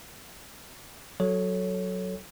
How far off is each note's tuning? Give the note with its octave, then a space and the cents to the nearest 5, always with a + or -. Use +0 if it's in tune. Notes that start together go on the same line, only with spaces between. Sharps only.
F#3 +5 A4 +0 C#5 +0